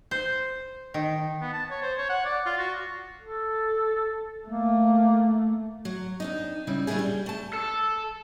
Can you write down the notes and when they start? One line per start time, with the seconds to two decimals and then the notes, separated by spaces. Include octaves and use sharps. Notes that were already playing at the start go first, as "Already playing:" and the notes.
0.11 C5
0.94 D#3
1.41 B3
1.53 A5
1.70 C#5
1.82 C5
1.98 C#5
2.10 F#5
2.25 D5
2.46 F4
2.58 F#4
3.22 A4
4.48 A3 A#3
5.85 F#3
6.20 F2 D4 D#4
6.67 C#3 G3 E4
6.87 G3 A3 A#3 D4 E4 G#4
6.99 G3
7.26 A3 A5
7.54 A4